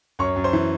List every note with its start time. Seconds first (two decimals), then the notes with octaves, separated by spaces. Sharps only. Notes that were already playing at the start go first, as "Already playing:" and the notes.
0.19 F#2 C#5 C#6
0.36 F#2
0.44 C5 C6
0.53 E3